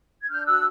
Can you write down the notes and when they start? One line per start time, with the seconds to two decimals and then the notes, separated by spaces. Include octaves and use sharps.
0.21 G#6
0.29 D4 F6 G6
0.46 F#4 E6 F#6